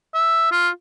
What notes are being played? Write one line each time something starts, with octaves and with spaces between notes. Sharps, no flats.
E5
F4